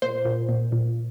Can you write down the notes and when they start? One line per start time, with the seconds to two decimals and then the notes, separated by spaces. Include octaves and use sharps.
0.02 A#2 C5
0.25 A#2
0.49 A#2
0.72 A#2